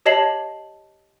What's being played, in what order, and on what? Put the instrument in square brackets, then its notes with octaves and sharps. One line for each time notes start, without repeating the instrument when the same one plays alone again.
[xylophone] G4 C#5 D#5 A5 C7 F#7